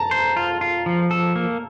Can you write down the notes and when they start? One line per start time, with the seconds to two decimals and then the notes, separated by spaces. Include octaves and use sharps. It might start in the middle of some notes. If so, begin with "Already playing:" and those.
Already playing: A5 A#5
0.11 C5
0.36 F4
0.61 F4
0.86 F3
1.11 A4
1.36 A#3